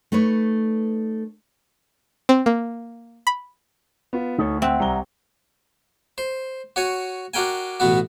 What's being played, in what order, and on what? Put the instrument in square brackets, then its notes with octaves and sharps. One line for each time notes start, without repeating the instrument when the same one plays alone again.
[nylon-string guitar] A3 D#4 B4 C#5
[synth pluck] C4
A#3
B5
[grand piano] B3 F4
[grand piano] D2 [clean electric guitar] D#4 A4 C#5
[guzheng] C4 [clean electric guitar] E5 F#5
[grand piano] C2 A#5 G7
[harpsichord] C5
F#4 C#5 G#5
D4 F#4 A#4 G5 G#5
A1 B2 B3 F#4